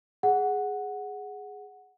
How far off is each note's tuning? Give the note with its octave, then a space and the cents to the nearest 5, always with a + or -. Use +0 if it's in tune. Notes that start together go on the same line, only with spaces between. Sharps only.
G#4 +0 F#5 +0